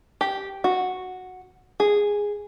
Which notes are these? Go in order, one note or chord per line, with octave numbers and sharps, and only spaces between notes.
G4
F#4
G#4